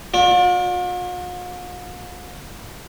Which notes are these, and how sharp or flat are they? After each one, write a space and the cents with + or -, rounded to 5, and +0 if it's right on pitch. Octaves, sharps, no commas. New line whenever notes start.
F4 +45 D5 +0